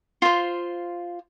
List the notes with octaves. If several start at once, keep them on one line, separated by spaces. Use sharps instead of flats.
F4 C5